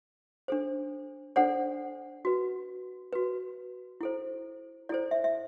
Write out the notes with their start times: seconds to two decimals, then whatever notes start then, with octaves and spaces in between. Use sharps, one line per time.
0.48 D4 A4 C5
1.36 D4 A4 C5 D5 F#5
2.25 F#4 B4
3.13 F#4 B4
4.01 E4 A4 C5
4.89 E4 A4 C5 D5
5.11 E5
5.24 E5